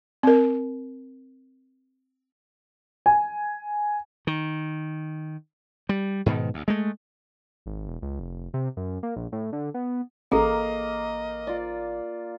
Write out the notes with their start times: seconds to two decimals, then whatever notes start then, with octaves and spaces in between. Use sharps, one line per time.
0.23 C4 A#4
3.06 G#5
4.27 D#3
5.89 G3
6.26 G#2 B2 D#3
6.54 D2
6.68 G#3 A3
7.66 G#1
7.88 E1
8.02 C#2
8.19 F1
8.54 C3
8.77 F#2
9.03 A#3
9.16 A#1
9.32 A2
9.53 D3
9.74 B3
10.32 A1 A#3 G#4 A4 D#5 A#5
11.47 F4 D5